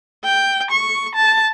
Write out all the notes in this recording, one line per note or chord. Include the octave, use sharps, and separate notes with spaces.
G5
C#6
A5